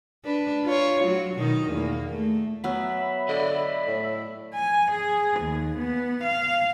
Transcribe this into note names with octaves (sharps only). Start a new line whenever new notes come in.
D4 B4
F4 C#5
F#3 F#4
B2 D#3 D#4
E2 A#3
A3
F#3 B3 E5 B5
D3 D5 D#5
A2
G#5
G#4
D#2
B3
F5